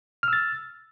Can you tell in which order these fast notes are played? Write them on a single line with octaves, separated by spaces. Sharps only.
F6 E6 A6